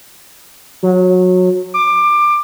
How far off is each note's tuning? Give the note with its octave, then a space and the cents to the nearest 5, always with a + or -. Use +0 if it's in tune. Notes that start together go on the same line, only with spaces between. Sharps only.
F#3 -20
D6 +20